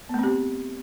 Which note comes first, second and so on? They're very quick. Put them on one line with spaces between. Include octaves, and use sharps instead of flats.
B3 A3 C4 G4